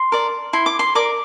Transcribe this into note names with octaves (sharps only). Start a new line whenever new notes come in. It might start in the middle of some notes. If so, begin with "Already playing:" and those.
Already playing: C6
A#4 D5
E4 C6
D6
C6
A#4 D5 D6